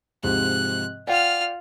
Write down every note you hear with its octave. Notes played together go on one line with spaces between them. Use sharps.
G#2 C3 F3 F#6
F4 D5 F#5 G5 F6